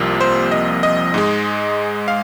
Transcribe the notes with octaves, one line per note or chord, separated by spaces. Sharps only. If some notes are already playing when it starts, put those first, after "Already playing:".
Already playing: C2 C3 F3 A#3
C5
D#5
D#5
G#2 G#3
F5